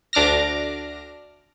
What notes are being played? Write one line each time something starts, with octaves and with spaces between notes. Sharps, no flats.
D2 D4 D6 F6 A#6